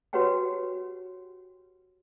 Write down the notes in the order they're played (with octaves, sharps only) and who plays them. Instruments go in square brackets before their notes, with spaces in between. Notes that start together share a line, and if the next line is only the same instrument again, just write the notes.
[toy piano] F#4 G4 B4 C#5 F#5 G5